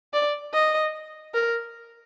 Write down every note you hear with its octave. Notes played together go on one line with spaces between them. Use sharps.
D5
D#5
A#4